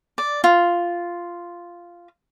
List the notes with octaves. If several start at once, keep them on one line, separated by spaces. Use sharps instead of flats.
D5
F4